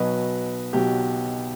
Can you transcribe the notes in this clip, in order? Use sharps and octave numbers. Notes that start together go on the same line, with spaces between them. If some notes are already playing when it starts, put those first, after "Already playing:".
Already playing: B1 B2 F#3 B4 D#5
B1 B2 F#3 G4